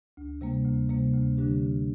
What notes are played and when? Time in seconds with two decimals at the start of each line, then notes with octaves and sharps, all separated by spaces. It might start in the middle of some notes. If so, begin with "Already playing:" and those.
0.17 D2
0.41 C3 G3 A#3
0.65 D2
0.89 C3 G3 A#3
1.14 D2
1.37 D3 G3 D4 G4
1.62 D2